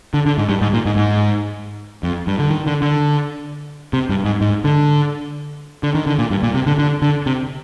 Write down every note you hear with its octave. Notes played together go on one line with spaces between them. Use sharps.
D3
D3
G#2
G2
G#2
A#2
G#2
G#2
F2
G2
D3
D#3
D3
D3
C3
G2
G#2
G#2
D3
D3
D#3
D3
A#2
G2
A#2
C3
D3
D3
D3
C3